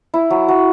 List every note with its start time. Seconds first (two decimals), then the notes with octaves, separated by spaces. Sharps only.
0.14 E4
0.30 F#3
0.49 F#3